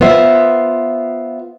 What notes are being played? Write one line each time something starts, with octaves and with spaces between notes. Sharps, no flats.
B3 F4 C5 E5